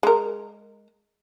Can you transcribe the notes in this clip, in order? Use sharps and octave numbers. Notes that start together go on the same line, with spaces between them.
G#3 A#4